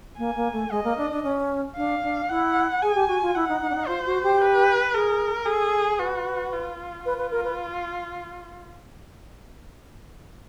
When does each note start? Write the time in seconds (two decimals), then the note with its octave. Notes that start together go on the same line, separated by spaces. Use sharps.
0.18 A#3 G#5
0.36 A#3
0.53 A3
0.71 G#3 D#5
0.84 A#3
0.97 D4
1.10 D4
1.23 C#4
1.76 D4 F5
2.03 D4
2.29 E4 F#5
2.82 G#4 G#5
2.95 G4
3.08 F#4
3.22 F4
3.34 E4 F#5
3.49 D#4
3.61 D#4
3.70 D4
3.75 D#4
3.87 F4 C5
4.06 F#4
4.23 G4
4.41 B4
4.94 G#4 A#4
5.46 G#4 A4
5.99 F#4 B4
6.52 F4
7.05 F4 B4
7.18 B4
7.31 A#4
7.44 B4